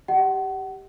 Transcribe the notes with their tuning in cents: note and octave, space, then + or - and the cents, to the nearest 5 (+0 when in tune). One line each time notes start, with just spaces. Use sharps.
G4 +0 D#5 +0 F#5 +35